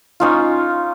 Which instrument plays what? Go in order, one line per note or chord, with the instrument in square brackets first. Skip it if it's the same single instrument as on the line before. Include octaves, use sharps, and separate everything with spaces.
[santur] C#4 D#4 F4